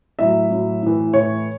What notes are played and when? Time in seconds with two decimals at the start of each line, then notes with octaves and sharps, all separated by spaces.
0.19 A2 F#3 E5
0.50 A2 F#3
0.82 A2 E3
1.13 A2 E3 C#5